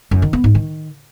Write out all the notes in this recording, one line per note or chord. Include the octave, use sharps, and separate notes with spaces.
F#2
D#3
B3
G#2
D#3